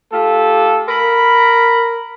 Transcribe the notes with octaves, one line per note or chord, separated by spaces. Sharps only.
A3 F4 G4 A4
A#4 B5